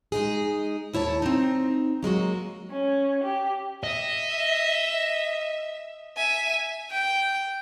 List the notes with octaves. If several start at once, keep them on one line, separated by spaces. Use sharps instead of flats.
G#3 D#4 G#4
D#2 E4 C#5 A5
C4 D#4
F#3 G#3 A#3 F#4
C#4
G4
D#5 E5
E5 G#5
G5